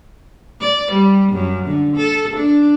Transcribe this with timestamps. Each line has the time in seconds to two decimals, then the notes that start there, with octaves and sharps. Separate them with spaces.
0.61 D5
0.92 G3
1.33 F#2
1.66 D3
1.97 A4
2.37 D4